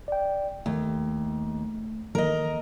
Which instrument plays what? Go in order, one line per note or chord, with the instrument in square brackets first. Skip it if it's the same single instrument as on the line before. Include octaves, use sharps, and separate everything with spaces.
[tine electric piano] D5 G5
[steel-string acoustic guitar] D#2 [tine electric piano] A3
[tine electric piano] D#3 E3 A#3 [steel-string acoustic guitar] A#4 D#5